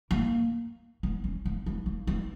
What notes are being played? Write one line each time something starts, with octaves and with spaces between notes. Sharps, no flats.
A#3
B3
C#4
B3
B3
A#3
B3